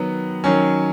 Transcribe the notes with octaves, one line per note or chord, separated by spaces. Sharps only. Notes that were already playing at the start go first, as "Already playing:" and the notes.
Already playing: D#3 F#3 B3
D#3 F#3 C#4